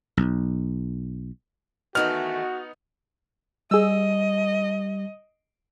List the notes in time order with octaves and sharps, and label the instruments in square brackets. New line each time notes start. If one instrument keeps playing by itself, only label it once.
[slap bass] B1
[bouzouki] D#3 E3 A3 [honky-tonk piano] B3 D#4 [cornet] F#4 [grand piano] F6
[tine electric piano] G3 [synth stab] G#4 E6 [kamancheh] D#5